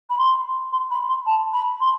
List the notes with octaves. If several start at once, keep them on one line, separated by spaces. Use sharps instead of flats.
B5
C6
C6
B5
C6
A5
B5
C6